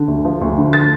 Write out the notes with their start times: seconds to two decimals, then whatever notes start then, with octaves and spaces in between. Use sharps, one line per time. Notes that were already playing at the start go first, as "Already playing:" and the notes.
Already playing: D3
0.08 D2
0.25 F3
0.42 D2
0.58 D3
0.73 A6